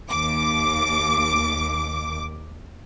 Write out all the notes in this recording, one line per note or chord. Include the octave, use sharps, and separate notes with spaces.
D#2 D6